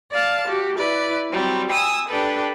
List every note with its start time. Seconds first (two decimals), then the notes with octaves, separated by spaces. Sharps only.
0.11 D5 F5 A5
0.48 F#4 G4
0.77 E4 B4 D5
1.30 F#3 G3 C4
1.70 G#5 D#6 E6
2.08 D4 G4 A4 B4